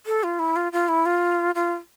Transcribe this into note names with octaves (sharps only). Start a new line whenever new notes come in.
A4
F4
E4
F4
F4
E4
F4
F4